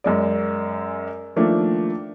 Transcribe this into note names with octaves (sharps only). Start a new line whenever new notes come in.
F#2 G#3 D5
D#3 F3 A3 A#3 D4